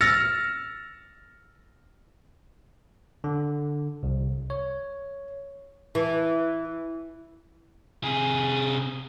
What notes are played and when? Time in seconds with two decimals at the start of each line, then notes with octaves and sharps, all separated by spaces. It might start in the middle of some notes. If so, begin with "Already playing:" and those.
0.01 E6 F6 A6 A#6 C#7
3.24 D3
4.03 C2
4.50 C#5
5.95 E3
8.03 C3 G#4